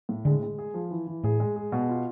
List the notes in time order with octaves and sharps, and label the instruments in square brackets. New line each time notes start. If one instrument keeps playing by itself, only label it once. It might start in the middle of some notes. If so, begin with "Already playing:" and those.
[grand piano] A2
[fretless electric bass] D3 [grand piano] G#3
[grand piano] G#3
G#4
F3
E3
E3
[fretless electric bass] A2 [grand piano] G#4
[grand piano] G#3
G#4
B2
F4